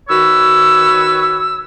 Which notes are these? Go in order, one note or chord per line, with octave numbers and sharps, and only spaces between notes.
D#3 F#4 B4 C#5 E6